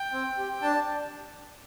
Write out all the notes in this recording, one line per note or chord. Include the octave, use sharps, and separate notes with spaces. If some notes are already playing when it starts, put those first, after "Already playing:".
Already playing: G5
C4
G4
D4 A5